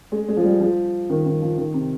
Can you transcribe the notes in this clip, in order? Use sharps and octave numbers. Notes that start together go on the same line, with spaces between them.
G#3
G#3
F3
G3
F3
D#3
D#3
F3
D#3
C3